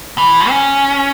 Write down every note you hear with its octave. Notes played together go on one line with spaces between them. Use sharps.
E3
C#4